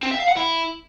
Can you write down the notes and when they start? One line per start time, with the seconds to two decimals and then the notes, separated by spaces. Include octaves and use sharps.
0.03 C4
0.11 E5
0.20 F5
0.28 F#5
0.37 E4